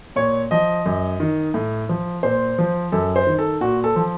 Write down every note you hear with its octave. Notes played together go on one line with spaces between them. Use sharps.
A#2 C#5
F3 D#5
F#2
D#3
A2
F3
A#2 C5
F3
F#2 A4
C5
D#3
A4
A#2 F#4
A4
F3